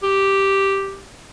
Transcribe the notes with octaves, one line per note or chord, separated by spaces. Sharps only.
G4